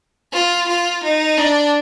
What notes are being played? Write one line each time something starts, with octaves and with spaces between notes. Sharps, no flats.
F4
F4
D#4
D4